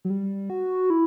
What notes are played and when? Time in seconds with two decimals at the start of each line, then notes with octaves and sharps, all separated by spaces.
0.05 F#3
0.10 G3
0.50 F#4
0.90 E4